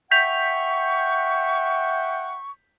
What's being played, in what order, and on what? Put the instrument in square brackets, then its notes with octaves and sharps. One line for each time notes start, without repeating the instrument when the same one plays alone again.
[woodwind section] E5 F#5 G5 [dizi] C#6 [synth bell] G6 B6 F7